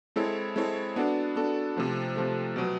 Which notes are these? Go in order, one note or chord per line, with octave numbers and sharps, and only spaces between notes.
G#3 C4 E4 A4 C#5
G#3 C4 E4 A4 C#5
B3 D4 F#4 A4
B3 D4 F#4 A4
C3 F3 A3
C3 F3 A3
B2 F#3 B3